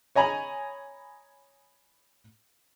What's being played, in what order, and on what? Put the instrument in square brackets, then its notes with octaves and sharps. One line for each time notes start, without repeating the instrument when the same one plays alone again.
[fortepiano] C#5 D#5 G#5 A#5 B5